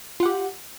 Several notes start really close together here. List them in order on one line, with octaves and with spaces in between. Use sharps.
F4 F#5 G4